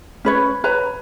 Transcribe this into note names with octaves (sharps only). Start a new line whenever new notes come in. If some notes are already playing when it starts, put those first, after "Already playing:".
C#4 B4 C#5
B4 C#5 A#5